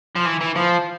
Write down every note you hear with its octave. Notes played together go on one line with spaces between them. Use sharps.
F3
E3
E3
F3